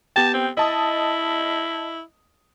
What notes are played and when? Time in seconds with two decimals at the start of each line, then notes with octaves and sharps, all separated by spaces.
0.16 B3 G4 G5 A5
0.34 C4
0.57 E4 D#5 A5 D#6